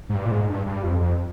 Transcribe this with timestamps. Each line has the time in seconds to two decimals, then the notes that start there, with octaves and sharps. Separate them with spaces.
0.09 G#2
0.15 G2
0.26 A#2
0.31 G#2
0.49 G2
0.66 G2
0.84 F2
1.01 F2